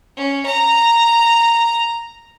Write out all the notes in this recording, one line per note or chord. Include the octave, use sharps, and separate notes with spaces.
C#4
A#5